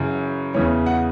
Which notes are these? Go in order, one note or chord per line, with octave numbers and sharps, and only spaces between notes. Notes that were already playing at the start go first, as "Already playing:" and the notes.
Already playing: F#2 C#3 E3
E2 C#3 E3 C#5
F#5